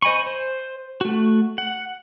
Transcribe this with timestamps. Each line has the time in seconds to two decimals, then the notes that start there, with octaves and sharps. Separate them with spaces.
0.02 C5 D#5 G#5 B5 C#6
0.26 C5
1.01 A3 F#4
1.58 F#5